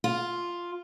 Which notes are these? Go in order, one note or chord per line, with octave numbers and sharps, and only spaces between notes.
F4